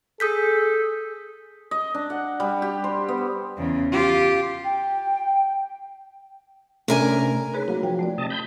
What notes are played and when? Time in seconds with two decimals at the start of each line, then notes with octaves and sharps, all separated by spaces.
0.20 G#4 A4 D#6 G6 B6
1.71 D#5
1.95 D4
2.10 F#5
2.40 G3
2.62 G4
2.84 C5
3.09 B3
3.58 E2 C#3
3.92 F4 G4
4.64 G5
6.88 C3 A3 C#4 D4 A#4 G#5
7.54 D#4 G#4 B4 C#5
7.68 F#3 A#3
7.83 F3 F#3 G5
7.99 A3 C4 D5
8.18 C3 D#5 A5
8.30 B5 G6